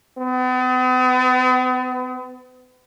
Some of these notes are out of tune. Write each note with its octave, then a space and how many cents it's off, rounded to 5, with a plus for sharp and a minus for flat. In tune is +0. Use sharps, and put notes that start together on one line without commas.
B3 +45